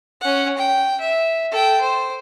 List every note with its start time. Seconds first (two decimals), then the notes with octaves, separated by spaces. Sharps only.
0.21 C#4 F#5
0.58 G5
1.01 E5
1.52 A4 G5
1.81 C5